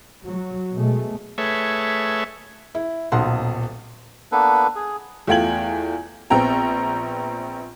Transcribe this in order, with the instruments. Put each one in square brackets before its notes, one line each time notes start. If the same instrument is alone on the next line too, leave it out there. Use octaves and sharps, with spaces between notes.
[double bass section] F#3
B2 G#3 A3
[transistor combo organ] A3 G#4 B4 C#5 E5
[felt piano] E4
D#1 B1 F#5 C6
[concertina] A#3 B3 D4 A4 B4
G#4
[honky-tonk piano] E2 A3 F4 G5 G#6 F#7
A#1 B3 C4 G5 A#5